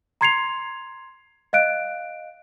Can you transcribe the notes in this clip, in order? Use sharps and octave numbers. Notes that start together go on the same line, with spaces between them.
A#5 C6 G#6 C7 C#7 F7
D#5 F5 F#6 D7